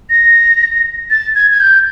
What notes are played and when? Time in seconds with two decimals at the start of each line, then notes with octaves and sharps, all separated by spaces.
0.10 A#6
1.10 A6
1.35 G#6
1.51 G#6
1.60 G6